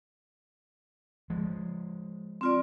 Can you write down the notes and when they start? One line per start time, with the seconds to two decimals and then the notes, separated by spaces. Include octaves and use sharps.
1.30 F3 G#3
2.41 C4 F4 D5